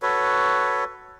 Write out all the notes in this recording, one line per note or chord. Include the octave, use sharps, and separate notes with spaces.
F#4 A4 B4 C#5